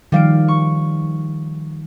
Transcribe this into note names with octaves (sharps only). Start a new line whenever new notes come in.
D#3 F3 G3 F5 D7
C#6